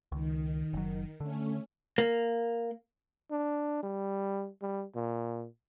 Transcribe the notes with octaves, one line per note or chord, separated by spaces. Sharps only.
C#2 D#3
F#1 F#3
D3 A3 C#4
A#3
D4
G3
G3
A#2